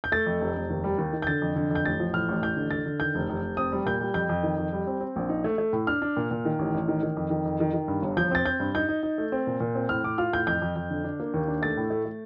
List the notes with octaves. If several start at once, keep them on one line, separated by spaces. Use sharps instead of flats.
G6
A3 A6
F2
F1
F1
D#2
G3
D#2
D#3
G6
D3 A6
F2
D3
F2 G6
A1 A6
F3
A2 F6
A1
A1 G6
D3
D3 A6
D3
D#3 G6
F1
F1
F1
C4 D#6
G3
A#2 G6
G3
F2 G6
F2
D#3
F2
G3
C4
C4
A#1
D#4
A3
A3
A2
D4 F6
D4
A#2
A#2
D#3
A1
A1
D#3
D#3
F2
D#3
F2
D#3
D#3
G2
G1
F3 G6
C4 A6
C4 G6
G2
D#4 G6
D#4
D#4
A3
C4
A#2
A#2
C4
A2 F6
A2 D6
F4 F6
A2 G6
F2 G6
F2
F2
D3
D4
A#3
D#2
D4
A3 A6
A2
A3
A3